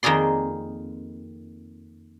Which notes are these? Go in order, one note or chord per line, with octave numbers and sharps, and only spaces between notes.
F2 D#3 A#3 G#4 D5 C6